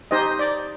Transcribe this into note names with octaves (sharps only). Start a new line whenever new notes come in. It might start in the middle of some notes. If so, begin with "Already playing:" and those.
D#4 G4 C5 D#5
D5